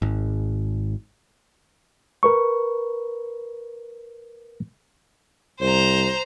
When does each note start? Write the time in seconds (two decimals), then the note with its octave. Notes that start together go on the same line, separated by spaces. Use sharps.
0.02 G#1
2.23 A#4 B4 C#6
5.61 C2 C5 A#5